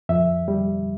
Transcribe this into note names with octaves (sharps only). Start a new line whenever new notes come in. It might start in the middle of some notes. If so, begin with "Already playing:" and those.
F2 E5
G3